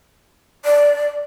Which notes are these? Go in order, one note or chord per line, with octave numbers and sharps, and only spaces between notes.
D5